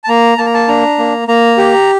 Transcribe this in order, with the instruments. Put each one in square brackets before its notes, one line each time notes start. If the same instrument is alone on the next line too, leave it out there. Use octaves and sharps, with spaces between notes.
[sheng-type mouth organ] A5
A#3 A#5
A#3 A5
A#5
A5
D4 A#5
A#3
A#3 A#5
G4